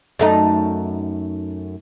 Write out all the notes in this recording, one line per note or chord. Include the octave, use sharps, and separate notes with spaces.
F#2 A3 D#4